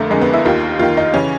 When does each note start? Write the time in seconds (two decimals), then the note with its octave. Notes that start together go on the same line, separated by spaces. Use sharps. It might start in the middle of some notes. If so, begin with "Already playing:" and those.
Already playing: F2 D3 A3 A#3
0.10 F2 D3 G#3
0.22 B3
0.34 E4
0.45 D#2 D#3 F4
0.79 D#2 D#3 F4
0.97 D#4
1.14 C#3 E3 C#4